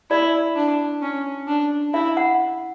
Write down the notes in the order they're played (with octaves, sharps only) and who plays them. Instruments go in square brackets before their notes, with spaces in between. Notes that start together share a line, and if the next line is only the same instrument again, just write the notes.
[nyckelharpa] E4 [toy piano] D5
[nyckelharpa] D4
C#4
D4
[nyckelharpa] E4 [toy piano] E5
[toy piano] F#5